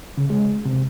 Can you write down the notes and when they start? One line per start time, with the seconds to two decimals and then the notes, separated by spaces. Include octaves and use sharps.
0.18 C#3
0.30 G#3
0.65 C3